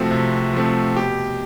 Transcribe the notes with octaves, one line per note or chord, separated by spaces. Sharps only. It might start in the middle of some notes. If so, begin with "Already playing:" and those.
Already playing: C3 F3 A3 C4 F#4
C3
F3 A3 C4
B2 G4